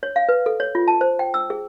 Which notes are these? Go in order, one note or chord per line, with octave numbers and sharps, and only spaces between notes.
C#5
F5
B4
A4
C#5
F4
A5
C5
G5
E6
G#4